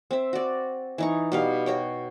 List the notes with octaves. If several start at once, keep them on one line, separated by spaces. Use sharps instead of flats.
C4 E5
F#4 D5
E3 D#4 C#6
B2 G3 F5
F#4 C#5 G5